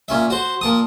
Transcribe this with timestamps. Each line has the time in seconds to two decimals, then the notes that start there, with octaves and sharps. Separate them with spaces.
0.08 A#2 C#4 E5
0.30 F#4 C5
0.61 A#2 A5 D#6